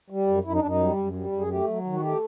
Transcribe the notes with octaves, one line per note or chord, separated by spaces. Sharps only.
G3
F#2
F#2 E4
D#4
D4
F#2
D#4
G3
F#2
G3
F#2
G#4
A3 G4
F#3
D#3
F#4
A3 G4